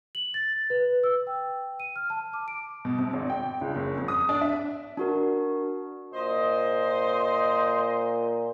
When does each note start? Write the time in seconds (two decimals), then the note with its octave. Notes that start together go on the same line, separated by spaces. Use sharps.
0.15 F#7
0.34 A6
0.70 B4
1.04 E6
1.27 G5
1.80 D#7
1.96 F6
2.10 A5
2.33 D6
2.48 D7
2.85 B2
2.99 C3
3.13 G#1
3.30 G5
3.61 C#2
3.76 F#1
3.97 F2
4.08 D#6
4.29 D4
4.41 E5
4.97 D4 F#4 A#4
6.14 A#2 C5 D#5